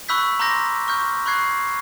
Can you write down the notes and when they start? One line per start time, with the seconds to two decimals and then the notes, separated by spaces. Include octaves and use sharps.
0.09 B5 C#6 E6 F#6 G6 B6
0.40 A#5 C6 D6 F6 G6 A#6
0.88 C#6 F6 G6
1.26 B5 C#6 F#6 G#6 C7